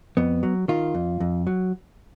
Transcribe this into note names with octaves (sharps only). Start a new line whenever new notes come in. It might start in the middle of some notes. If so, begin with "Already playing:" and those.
F2 B3
F#3
D#3 F4
F2
F2
F#3